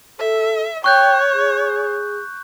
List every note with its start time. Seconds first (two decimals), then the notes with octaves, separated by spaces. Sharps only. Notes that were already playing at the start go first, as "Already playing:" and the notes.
0.19 A4 E5
0.84 C#5 G5 C#6 F#6 G6
1.33 G#4